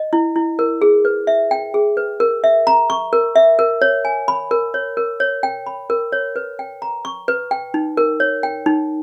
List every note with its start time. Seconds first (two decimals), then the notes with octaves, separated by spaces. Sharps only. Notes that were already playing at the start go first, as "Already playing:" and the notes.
Already playing: D#5
0.13 E4
0.36 E4
0.59 A#4
0.82 G#4
1.05 B4
1.27 E5
1.51 G5
1.74 G#4
1.97 B4
2.20 A#4
2.44 E5
2.67 A#5
2.90 C#6
3.13 A#4
3.36 E5
3.59 A#4
3.82 C#5
4.05 G#5
4.28 B5
4.51 A#4
4.74 C#5
4.97 A#4
5.20 C#5
5.43 G5
5.66 B5
5.90 A#4
6.12 C#5
6.36 B4
6.59 G5
6.82 A#5
7.05 C#6
7.28 B4
7.51 G5
7.74 D#4
7.97 A#4
8.20 C#5
8.43 G5
8.66 D#4